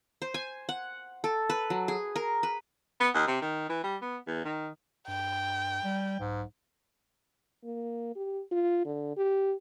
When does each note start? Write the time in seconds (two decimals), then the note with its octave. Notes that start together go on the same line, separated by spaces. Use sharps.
0.22 C5
0.34 G#5
0.69 F#5
1.24 A4
1.49 B4
1.70 F#3
1.88 G#4
2.16 A#4
2.43 B4
3.00 B3
3.14 D#2
3.27 C3
3.41 D#3
3.69 E3
3.83 G3
4.01 B3
4.27 E2
4.45 D#3
5.08 G2 G5
5.84 G3
6.20 B1 G#2
7.64 A#3
8.16 G4
8.52 F4
8.85 D3
9.17 G4